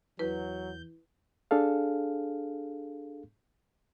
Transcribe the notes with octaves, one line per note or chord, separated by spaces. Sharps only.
E2 F#3 E4 B4 G6
D4 G#4 A4 F5